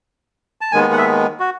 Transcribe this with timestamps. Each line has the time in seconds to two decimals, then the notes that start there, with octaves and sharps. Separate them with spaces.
0.61 A5
0.72 D#2 D#3 G#3 B3 G#5
0.93 F#5
0.98 E5
1.40 F#4